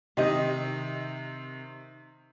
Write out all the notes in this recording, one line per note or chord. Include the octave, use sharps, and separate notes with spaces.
C3 D#3 G4 D#5